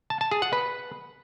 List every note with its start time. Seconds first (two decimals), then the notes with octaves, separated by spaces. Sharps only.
0.10 A5
0.21 A5
0.31 G#4
0.42 F#5
0.53 B4